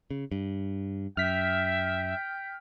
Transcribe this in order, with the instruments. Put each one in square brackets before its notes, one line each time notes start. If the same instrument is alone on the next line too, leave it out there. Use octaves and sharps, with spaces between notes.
[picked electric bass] C#3
G2
[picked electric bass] F#2 [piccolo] E5 [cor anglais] G5 [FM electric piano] F6 B6